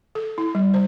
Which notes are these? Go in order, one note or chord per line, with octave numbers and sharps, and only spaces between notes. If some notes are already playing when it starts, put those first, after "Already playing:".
A4
E4
G3
C5